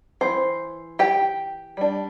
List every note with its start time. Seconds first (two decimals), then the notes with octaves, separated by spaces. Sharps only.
0.21 E3 C4 C5
0.99 G4 G5
1.77 G3 D4